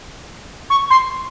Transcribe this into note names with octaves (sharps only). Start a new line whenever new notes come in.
C#6
C6